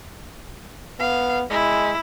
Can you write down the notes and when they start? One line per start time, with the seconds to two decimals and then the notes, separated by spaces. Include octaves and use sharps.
1.00 B3 F5
1.50 G#3 E4